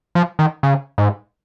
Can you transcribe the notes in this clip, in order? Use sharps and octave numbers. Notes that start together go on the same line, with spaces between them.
F3
D#3
C#3
G#2